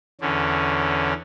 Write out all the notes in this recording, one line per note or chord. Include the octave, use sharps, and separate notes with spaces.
E2 D3 C#4